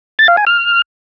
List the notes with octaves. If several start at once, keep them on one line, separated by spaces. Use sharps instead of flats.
A6
F5
G#5
F6